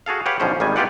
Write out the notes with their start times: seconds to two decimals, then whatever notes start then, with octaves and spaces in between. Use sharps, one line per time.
0.06 F#4 G#4 A4 F5
0.26 G4 B4 C#5 F5 F#5
0.40 B1 D3 E3 F3 C#4 C5
0.60 G#1 D#3 G3 G#5
0.76 B3 E4 F4 G4 D5 F#5